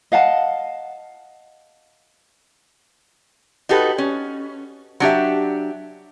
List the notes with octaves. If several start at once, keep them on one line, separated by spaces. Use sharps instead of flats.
D#5 F5 F#5 A5
D#4 F#4 G4 A4 B4
C#4
F#3 D4 G4 E5